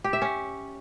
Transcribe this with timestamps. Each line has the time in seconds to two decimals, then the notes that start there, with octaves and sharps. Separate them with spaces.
0.04 G4
0.13 E5
0.22 C#4